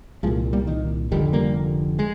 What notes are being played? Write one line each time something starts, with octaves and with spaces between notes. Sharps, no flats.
C2 A#2 F3 G#3
G3 A#3
D#3
F1 F2 D3 D#3 G3
G3 A#3
G#3